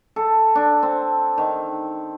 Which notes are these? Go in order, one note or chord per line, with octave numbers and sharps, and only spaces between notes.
A4
D4
C4
D#3